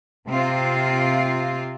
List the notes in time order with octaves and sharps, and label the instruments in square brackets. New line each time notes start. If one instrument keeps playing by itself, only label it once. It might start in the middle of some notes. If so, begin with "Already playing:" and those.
[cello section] C3 C4 F4